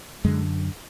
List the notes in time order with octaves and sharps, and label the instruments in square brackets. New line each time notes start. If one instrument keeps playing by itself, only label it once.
[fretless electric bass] F#2 D3 G#3